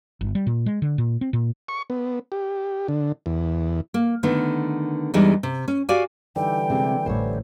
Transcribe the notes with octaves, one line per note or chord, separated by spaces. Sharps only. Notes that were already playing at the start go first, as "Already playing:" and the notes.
G1
G3
A#2
G#3
D3
A#2
C4
A#2
C#6
B3
G4
D3
E2
A#3
D3 D#3 A3 B3
E2 E3 G3 G#3 D4 D#4
C3
C#4
F#4 G4 D5 F5 G#5
D3 E3 G3 D#4 G5
C3 G#3 C4
A1 C5 C#5